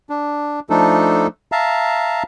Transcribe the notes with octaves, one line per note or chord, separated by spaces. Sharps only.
D4
F3 A3 D4 D#4 A4
E5 F5 A5 A#5